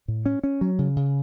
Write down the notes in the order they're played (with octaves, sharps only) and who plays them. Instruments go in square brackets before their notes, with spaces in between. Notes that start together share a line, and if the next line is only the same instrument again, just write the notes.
[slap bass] A2
C#4
C#4
F#3
C#3
C#3